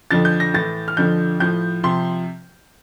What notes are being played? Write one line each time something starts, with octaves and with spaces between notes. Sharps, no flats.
F2 D3 F3 A6
G6
A#6
A2 E3 A6
F6
F2 D3 F3 G6
A2 F3 G6
C3 F3 C6